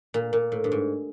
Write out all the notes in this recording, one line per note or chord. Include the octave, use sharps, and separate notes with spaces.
A#2
A#2
A2
G2
G#2